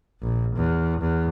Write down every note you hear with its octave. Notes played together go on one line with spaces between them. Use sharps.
A#1
E2
E2